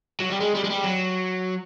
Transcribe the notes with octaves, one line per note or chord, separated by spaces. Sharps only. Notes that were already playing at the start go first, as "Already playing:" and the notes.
F#3
G3
G#3
G3
G#3
G3
F#3